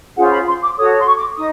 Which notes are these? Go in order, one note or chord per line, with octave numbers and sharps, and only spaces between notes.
C#4 F4 G#4 C5 F#5
B5
C6
D6
F#4 A4 C#5 D#6
C6
C#6
D6
D#4 D#6